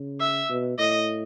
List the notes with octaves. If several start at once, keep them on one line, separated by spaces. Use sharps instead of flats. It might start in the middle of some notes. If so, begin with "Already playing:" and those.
Already playing: C#3
E5
B2
A2 D#5